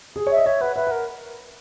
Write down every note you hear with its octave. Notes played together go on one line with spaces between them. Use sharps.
G#4
C#5 E5
D#5
C#5 E5
B4 F#5
B4 E5
A#4 F#5